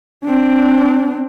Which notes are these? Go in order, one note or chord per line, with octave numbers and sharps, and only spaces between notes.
C4 D4